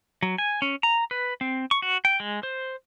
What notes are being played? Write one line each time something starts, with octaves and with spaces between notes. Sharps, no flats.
F#3
G#5
C#4
A#5
B4
C4
C#6
F#4
G5
G#3
C5